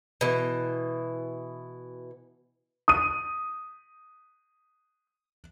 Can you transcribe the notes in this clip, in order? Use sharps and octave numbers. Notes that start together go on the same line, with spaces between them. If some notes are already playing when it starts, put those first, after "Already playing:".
B2 E3
D#6 D#7